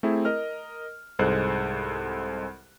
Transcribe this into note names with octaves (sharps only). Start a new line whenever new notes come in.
A3 C4 E4 G#4
A#4 D#5 F6
C2 G#2 G#3 A4 C5 F#6